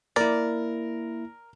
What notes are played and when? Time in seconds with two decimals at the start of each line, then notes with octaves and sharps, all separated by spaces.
0.16 A#3 E4 A#4 D5